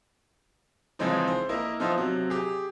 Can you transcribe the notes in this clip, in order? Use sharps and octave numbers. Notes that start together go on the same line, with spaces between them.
C#3 E3 F3 G#3 C4 D#4
C5
A#3 E4 A#4 D#5
F3 B3 D#4 F4 C5 E5
C3 F#3
G4 G#4